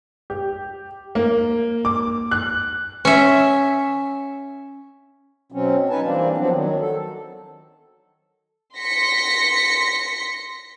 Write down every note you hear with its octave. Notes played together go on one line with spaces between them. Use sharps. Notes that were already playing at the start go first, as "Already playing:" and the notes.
G4
A#3
D6
F#6
C#4 E5
B2 F#3 C4 C#4
C#4 D#4 B4 G#5 A5
E3 G3 A#3 C4 D4
F3 F#3 B3 C4 D4
D#3 F#3
A4
C6 A#6 B6 C#7